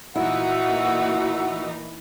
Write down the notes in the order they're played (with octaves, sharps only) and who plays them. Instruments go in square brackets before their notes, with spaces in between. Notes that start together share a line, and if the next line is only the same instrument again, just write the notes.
[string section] A#2 E3 D#4 [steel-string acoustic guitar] E4 [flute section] F#4 E6 [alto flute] F#5